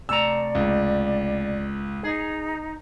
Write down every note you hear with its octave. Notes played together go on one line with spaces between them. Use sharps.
C3 A3 D5 A#5 E6
C#2
D#4 G#4